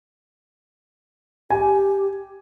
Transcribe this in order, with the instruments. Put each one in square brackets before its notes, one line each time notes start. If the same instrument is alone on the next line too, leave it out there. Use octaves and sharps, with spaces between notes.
[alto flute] G4 [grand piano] G#5